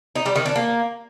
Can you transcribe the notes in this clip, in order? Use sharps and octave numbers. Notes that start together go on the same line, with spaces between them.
D#4
G3
D#3
D4
A#3